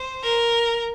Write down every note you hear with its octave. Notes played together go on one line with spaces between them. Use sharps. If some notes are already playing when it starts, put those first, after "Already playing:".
Already playing: C5
A#4